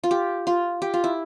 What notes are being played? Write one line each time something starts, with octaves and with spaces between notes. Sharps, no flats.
F4
G4
F4
G4
F4
E4